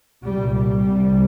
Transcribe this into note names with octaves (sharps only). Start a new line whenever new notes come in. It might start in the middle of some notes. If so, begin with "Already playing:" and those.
C2 A#2 G3
G3
C2 C3